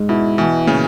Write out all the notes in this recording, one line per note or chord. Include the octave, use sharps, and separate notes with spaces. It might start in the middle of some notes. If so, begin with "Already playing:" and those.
Already playing: G#2
B2 E4
B2 E3
A#2 C#3